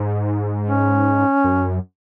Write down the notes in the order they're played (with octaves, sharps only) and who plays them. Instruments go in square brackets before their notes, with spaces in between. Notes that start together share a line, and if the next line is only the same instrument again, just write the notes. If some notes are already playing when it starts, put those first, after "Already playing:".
Already playing: [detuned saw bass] G#2
[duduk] C#4
[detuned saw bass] F#2